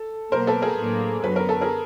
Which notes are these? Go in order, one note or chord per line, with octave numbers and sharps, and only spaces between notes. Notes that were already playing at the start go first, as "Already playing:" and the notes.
Already playing: A4
B2 F#3 A#3 A#4 C5
A4 B4
G#4 A#4
A2 F#3 A#3 D4
F#2 D3 F#3 B3 B4
A#4
A4
G#4 A#4